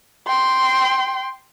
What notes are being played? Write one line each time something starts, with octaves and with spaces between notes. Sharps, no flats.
G5 C6